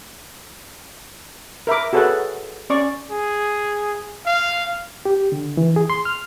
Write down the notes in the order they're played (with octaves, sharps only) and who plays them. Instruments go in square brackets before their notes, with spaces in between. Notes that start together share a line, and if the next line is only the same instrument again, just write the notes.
[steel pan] A#4 E5 B5 D6
F#4 G#4 A4 B4 C#5 F#5
C#4 D5 C#6
[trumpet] G#4
F5
[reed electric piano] G4
D3
E3
G#4
C6
F6